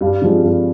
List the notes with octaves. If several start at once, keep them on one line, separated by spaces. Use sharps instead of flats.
G2 F5
D3 F3 G#3 C4
G2